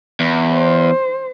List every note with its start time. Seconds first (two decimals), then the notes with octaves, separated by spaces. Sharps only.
0.20 E2
0.53 C5